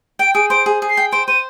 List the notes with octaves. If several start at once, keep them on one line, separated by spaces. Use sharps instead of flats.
G5 D7
G#4 D7
C5 D7
G#4
G#4
C7
G5
C5 D7
C5 D#7